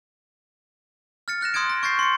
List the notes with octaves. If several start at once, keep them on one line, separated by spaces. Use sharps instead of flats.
F6 A6 C#7
F6 F#6 A#6 E7
C6 D#6 F#6 G#6 D7
A#6
C#6 G6 A6 C7
C6 C#7